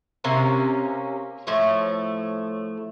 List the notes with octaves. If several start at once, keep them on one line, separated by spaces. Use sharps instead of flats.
C3 A#3 C#4
A2 F3 A3 C#5